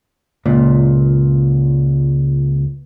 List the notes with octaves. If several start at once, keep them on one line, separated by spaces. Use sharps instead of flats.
C#2 A#2